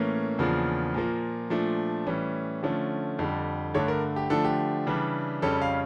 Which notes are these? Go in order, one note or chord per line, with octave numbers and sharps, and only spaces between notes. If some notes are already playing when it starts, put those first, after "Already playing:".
Already playing: A2 E3 A#3 C#4
E2 C#3 F3 A#3 D4
A#2 F3 A#3
A#2 F3 A3 D4
A2 E3 G3 C#4
D3 F3 A3 C#4
F2 D3 G3
G2 D3 A3 C#5
A#4
G4
D3 F3 A3 D4 A4
G4
C#3 E3 G3 D4
F2 C#3 G3 C#4 A4
F5